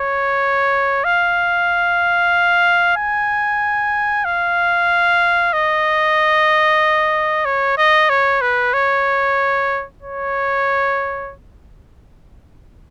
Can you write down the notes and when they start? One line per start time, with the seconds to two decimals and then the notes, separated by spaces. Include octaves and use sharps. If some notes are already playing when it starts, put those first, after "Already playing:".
Already playing: C#5
1.04 F5
2.97 G#5
4.25 F5
5.53 D#5
7.45 C#5
7.78 D#5
8.10 C#5
8.41 B4
8.74 C#5
10.02 C#5